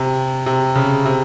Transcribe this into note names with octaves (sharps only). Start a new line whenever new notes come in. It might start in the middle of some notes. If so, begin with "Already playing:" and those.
Already playing: C3
C3
C#3
C3